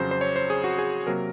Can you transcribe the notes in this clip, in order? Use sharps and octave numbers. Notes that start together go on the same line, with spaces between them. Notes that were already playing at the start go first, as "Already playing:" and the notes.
Already playing: F2 C#3 F#3 C5
C5
C#5
C5
G#4
F#4
G#4
C3 F#3 A#3 A#4